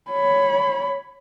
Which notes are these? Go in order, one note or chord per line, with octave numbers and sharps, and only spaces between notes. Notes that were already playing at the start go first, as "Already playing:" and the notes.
C#5 B5